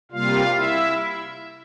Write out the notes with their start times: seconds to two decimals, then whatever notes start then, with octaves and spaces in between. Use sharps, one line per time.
0.12 C3 G3 A#3 F4 F5
0.55 E4 E5